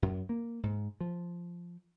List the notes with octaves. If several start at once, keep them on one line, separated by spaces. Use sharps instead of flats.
F#2
A#3
G#2
F3